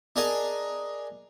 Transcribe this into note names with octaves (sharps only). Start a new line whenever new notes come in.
D4 G#4 A#4 D5 D#5 G#5